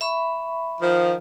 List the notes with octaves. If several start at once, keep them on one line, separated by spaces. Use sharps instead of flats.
E5 B5 C#6
D#3 F3